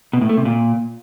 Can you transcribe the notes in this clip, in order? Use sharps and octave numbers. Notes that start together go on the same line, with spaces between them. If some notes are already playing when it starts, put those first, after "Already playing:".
B2
A2
A3
C3
A#2